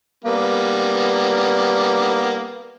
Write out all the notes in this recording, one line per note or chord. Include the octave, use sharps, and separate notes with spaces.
G3 A#3 B3